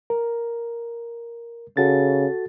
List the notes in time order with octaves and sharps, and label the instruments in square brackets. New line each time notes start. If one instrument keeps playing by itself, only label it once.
[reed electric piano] A#4
[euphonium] C#3 [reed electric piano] F#4 A4 A6